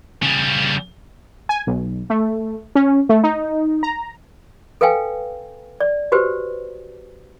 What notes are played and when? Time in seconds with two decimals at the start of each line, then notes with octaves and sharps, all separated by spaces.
0.23 C#3 G3
1.49 G#5
1.67 B1
2.10 A3
2.75 C#4
3.09 A3
3.23 D#4
3.83 A#5
4.81 A4 B4 F5 G5 G#5
5.80 D5
6.12 F#4 G4 B4 C5